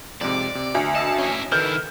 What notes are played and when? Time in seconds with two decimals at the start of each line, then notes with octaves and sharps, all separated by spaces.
0.21 F2 G#2 C3 D5
0.55 C3
0.75 D2 C#7
0.95 D#5 A5 E6
1.18 C#4 E4
1.52 D#3 E4 A4 B4 F6 G6